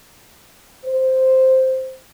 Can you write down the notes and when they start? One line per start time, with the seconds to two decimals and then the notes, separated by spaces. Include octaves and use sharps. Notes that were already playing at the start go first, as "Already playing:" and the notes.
0.85 C5